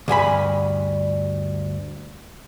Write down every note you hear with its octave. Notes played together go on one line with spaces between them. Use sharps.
D2 G2 G#5 B5